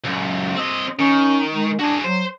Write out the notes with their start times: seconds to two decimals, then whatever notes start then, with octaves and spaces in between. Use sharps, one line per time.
0.05 C#2 F#2
0.56 C4 D#5
0.99 D#3 C#4
1.52 G#3
1.80 D4 F#4 G#4
2.04 F#3 C5